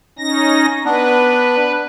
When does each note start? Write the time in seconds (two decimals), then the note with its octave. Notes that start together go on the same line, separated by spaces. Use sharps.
0.19 C#4 D#4 A#6
0.85 B3 D4 B4